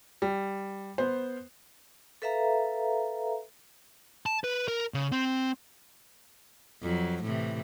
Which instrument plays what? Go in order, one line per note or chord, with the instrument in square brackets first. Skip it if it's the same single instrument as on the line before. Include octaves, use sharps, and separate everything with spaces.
[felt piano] G3
B3 C5
[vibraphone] A4 B4 E5 F5 A#5
[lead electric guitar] A5
B4
A#4
C#3
C4
[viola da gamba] F2 F#3
A2 C3 E3